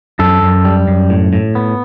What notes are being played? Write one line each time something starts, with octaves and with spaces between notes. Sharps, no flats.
F#2 A4
F#2
G3
F#2
A2
A2
B3